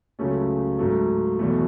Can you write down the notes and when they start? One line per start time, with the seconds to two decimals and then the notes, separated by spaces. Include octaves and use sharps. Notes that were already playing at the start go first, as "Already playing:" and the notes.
0.19 C#2 C#3 F#3 A3 C#4
0.79 G#2 F#3 A3
1.39 E2 B2 F#3 A3